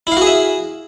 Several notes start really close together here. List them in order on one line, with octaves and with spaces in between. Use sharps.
E4 F5 F#4 G#4 E5